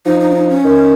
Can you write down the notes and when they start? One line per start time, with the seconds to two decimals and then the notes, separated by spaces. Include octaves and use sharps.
0.05 F3 D#4
0.20 D#4
0.31 D4
0.35 D#4
0.49 C#4
0.65 D#3